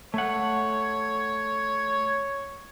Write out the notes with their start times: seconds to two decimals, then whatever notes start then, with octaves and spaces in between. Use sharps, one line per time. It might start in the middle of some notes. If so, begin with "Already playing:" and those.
0.14 A3 C#5 F#5